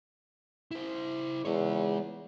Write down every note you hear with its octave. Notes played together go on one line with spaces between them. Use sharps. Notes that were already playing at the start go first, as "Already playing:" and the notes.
E4 C5
E2 G#3 C#5